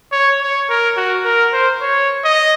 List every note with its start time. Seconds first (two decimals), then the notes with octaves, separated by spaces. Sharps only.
0.12 C#5
0.41 C#5
0.70 A#4
0.97 F#4
1.25 A#4
1.53 C5
1.81 C#5
2.24 D#5